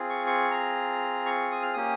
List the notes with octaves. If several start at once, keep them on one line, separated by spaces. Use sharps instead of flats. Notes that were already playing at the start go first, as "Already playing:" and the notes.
Already playing: C4 F4 G#4
C#6
C#6
A#5
C#6
D#6
F6
A#3 C#4 G4 D#6